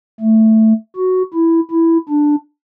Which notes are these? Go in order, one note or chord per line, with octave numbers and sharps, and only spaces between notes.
A3
F#4
E4
E4
D4